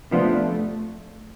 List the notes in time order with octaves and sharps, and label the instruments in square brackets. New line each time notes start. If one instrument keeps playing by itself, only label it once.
[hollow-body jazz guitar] C3 F3 B3 D4 F4 [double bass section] A3